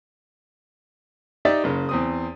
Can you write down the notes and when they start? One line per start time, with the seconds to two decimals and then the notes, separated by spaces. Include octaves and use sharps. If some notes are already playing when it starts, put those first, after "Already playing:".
1.45 D#4 G4 D5 E5 G5 A6
1.64 F#1 C#3
1.89 E2 C4 D#6